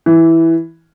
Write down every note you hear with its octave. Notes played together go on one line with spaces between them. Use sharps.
E3